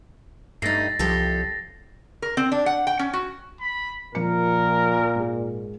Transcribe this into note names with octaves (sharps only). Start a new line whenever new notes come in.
G2 A3 D#4 A6 A#6 C7
C2 F3 G4 A4
A#4
C4
D4
F#5
G5
C#4
F#4
B5
A#2 F3 A#4 C#7
G#2 G#3